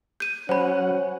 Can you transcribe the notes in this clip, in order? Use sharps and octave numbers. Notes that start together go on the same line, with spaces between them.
G6 D#7
F#3 C#4 C5 F#5 B5